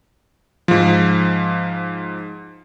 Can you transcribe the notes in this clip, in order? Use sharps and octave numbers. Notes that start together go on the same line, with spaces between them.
G#2 F3